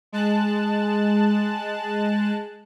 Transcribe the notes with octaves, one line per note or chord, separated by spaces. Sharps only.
G#3 A5 F#6